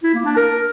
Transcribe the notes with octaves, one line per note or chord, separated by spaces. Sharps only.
E4
A#3
D4
A#4